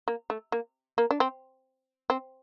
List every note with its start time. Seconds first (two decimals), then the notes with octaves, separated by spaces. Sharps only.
0.08 A#3
0.30 A3
0.52 A#3
0.98 A#3
1.11 D4
1.20 C4
2.10 C4